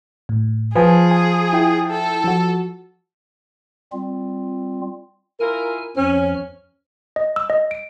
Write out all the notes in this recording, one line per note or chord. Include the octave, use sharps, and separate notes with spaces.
A2
F3 G#4 B4 G#5
G#5
E4 G5
A4
F3 F#4
G3 C4 F4
E4 F4 A#4 G#5 F6
F2 F3 C#4 F6
D#5
E6
D#5
D7